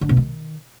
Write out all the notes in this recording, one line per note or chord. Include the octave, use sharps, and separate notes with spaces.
D3
B2
D#3